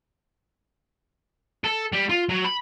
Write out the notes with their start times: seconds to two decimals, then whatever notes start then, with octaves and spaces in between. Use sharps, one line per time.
1.64 A4
1.93 G3
2.10 F4
2.30 F#3
2.44 B5